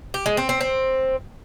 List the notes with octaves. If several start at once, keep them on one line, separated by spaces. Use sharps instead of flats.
G4
G#3
C4
C4
C4